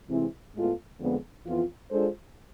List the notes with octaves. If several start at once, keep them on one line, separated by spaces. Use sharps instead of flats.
C3 E3 G#3 C4 E4
A2 G#3 B3 F4 A4
F2 D3 G#3 B3
F2 E3 B3 F4
G#3 D4 F4 A4 C5